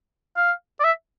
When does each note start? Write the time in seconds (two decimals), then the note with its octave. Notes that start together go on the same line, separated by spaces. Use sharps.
0.37 F5
0.80 D5
0.84 E5